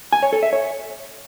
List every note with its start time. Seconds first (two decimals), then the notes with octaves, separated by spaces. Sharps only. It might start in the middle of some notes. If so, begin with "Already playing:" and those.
0.13 G#5
0.23 C#5
0.33 A4
0.43 E5
0.53 C#5